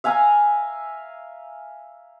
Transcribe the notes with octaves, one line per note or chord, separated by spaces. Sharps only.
E5 F5 G#5 A#5